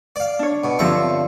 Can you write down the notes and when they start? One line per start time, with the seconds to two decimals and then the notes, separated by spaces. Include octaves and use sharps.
0.16 D5 F5
0.39 D4 C#5
0.64 B2
0.79 G2 D3 F3 C4 E5 C#6